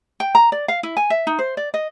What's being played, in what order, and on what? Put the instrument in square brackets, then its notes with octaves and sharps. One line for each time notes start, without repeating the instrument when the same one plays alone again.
[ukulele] G5
A#5
D5
F5
E4
G#5
E5
D#4
C5
D5
D#5